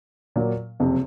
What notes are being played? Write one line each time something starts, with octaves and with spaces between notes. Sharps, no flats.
A#2 F#3 A#3
F#1 F2 C3